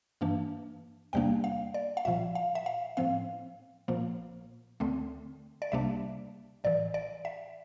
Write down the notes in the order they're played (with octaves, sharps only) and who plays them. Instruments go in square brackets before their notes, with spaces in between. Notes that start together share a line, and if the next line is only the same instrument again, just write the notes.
[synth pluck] G2 E3 A#3 D4
E2 C3 G3 A#3 D4 G5
F5
D5
F5
C2 A#2 F3 E5
F5
E5
F5
A2 F3 C4 F5
A#1 A#2 F3 A#3
D2 D3 A3 C4
D5
C2 C3 G3 A#3 D4 E5
A1 A2 E3 D5
D5
E5